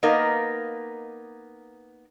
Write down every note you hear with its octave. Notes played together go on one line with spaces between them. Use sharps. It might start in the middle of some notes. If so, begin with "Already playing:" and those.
A#3 B3 D#4 A#4 D#5 F5